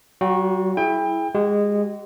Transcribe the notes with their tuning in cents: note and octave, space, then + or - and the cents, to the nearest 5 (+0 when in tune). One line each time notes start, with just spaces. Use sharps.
F#3 +40 F#4 -25 G5 +0
E4 +0 G#4 +30 G5 +30
G#3 -15 G4 -45